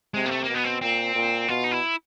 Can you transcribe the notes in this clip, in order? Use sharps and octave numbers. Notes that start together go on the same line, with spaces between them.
C3 G#3
A#3
A3
B2 A#3
B3
C4
A#2 C4
A#2
B2 F4
D#4
E4